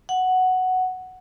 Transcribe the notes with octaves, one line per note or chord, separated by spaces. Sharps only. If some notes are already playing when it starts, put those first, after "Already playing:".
F#5